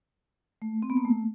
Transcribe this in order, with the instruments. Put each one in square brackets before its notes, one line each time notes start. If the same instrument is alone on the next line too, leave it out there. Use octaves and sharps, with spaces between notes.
[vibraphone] A3
C4
B3
A#3
A3